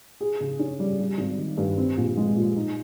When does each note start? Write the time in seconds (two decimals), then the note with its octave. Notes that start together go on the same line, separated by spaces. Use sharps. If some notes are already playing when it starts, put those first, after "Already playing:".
0.21 G#4
0.41 C#3
0.59 C#4
0.80 G3
0.99 G3
1.18 G#1
1.38 D#3
1.58 G2
1.77 C4
1.97 A#1
2.17 G#3
2.36 A#2
2.56 D#4